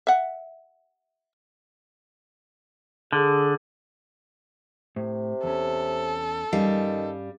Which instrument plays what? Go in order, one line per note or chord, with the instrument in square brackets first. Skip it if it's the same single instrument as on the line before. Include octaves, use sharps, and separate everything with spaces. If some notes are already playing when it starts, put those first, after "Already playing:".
[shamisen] E5 F#5
[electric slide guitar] D3 [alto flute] G#4
[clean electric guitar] A2 [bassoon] C3
[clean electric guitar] E2 C#4 [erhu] A4
[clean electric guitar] G2 C#4 F5 [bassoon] D#3 [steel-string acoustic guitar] G3